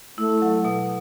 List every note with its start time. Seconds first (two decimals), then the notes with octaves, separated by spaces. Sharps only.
0.18 A3 E4
0.42 F#3
0.65 B2